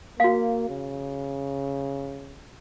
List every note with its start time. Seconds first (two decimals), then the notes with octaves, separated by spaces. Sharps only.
0.20 A#3 F#4 F5
0.70 C#3